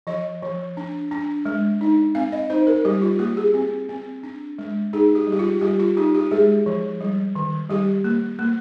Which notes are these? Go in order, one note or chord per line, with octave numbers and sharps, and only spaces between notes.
F3 D#5
F3
D4
D4
G#3
D#4
C4 F5
D#5
D#4 C5
A#4
G3 G4
F4
A#3 G4
G#4
C4
C4
D4
G#3
D#4 G#4
G4
G3
G4
F4
F4
G3 G4
F4
D#4 G4
G4
G#3 G#4
F3
G3
D#3
G3 G4
A#3
A#3